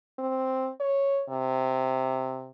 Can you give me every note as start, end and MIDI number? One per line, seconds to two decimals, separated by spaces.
0.19 0.70 60
0.80 1.23 73
1.29 2.51 48